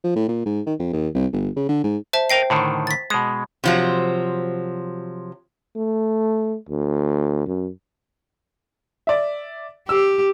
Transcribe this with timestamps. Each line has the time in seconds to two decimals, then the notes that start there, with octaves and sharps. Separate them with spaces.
0.04 F3
0.16 A2
0.29 A#2
0.46 G#2
0.67 D#3
0.80 F2
0.93 D#2
1.15 C2
1.33 G1
1.57 C#3
1.69 D3
1.84 G#2
2.13 C5 E5 A5
2.29 A#4 C5 D#5 G5 C7
2.50 A2 D3 D#3
2.87 A6 B6
3.10 B2 G#3 D#6
3.64 C3 F3 F#3
5.76 A3
6.69 D2
7.46 F#2
9.07 D5 E5
9.89 G4 E6